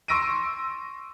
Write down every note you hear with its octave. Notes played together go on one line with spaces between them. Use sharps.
C6 C#6 E6 A#6 D7 D#7